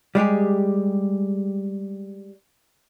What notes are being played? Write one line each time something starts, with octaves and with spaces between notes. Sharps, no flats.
G3 G#3 G4 G#4